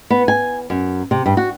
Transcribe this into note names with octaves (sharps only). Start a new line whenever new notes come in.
B3
G#5
F#2
C3
G2
F#4